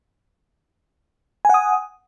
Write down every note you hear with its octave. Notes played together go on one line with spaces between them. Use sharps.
F#5 G#5 D#6